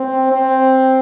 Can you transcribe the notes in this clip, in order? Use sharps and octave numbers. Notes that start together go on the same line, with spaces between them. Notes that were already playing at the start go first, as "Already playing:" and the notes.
Already playing: C4
C4